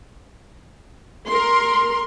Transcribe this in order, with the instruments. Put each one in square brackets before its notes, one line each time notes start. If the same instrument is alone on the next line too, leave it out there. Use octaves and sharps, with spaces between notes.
[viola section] A#4 C6